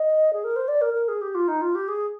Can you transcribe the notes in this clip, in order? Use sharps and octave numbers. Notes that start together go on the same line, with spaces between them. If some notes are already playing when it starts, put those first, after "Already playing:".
Already playing: D#5
G#4
A#4
C5
D5
A#4
A#4
G#4
G4
F4
D#4
F4
G4
G#4